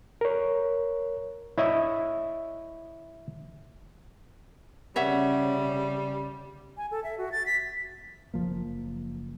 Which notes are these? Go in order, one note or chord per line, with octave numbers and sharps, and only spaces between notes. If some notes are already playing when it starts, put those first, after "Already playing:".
A#4 C#5
E4 C#5 D#5 E5
C#3 G3 C#5 E5 F#5
G#5
A4
E5
F#4
A6
B6
F#1 F3 A#3